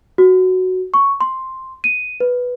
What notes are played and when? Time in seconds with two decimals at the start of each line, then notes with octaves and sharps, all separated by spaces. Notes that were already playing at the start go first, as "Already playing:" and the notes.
0.18 F#4
0.94 C#6
1.21 C6
1.84 D#7
2.20 B4